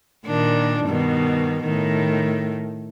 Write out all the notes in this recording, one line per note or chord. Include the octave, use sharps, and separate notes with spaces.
A#2 D#3 D4
G2 B2 D#3
A2 D#3